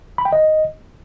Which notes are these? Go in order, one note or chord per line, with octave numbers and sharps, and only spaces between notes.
B5
G5
D#5